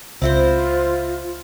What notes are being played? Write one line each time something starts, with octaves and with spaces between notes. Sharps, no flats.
C#2 C4 E4 F4 C5